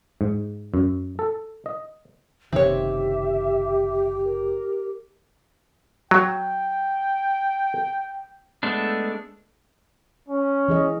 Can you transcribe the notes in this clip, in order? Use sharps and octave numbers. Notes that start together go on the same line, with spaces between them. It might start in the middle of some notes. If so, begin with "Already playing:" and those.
G#2
F#2
A4
D#5
F#1 C3 D#3 C4 G4 C#5 E5
A#4
F#3 G5
G#3 A3 B3 D4
C#4
E3 G#4 D#5